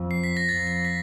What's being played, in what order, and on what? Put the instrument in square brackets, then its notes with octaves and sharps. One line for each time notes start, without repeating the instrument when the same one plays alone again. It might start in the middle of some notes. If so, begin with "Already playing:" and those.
Already playing: [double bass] F2
[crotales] C7
B6
A#6
[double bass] F2 [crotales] A6
[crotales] A#6
B6